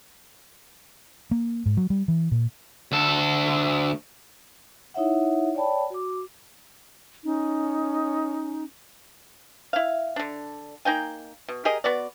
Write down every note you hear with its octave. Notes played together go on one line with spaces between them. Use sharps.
A#3
G#2
F#3
G3
E3
A#2
D2 A4
D#4 E4 C#5 E5 F#5
C#5 D5 G5 A5 B5
F#4 D6
C#4 D#4
E4 F5
D3 D4
A#3 D#4 G5 G#5
B2
G4 G#4 A#4 D#5
B3 F#4 D5